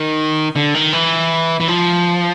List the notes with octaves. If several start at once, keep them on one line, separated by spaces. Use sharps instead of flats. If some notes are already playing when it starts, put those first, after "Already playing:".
Already playing: D#3
D3
D#3
E3
E3
F3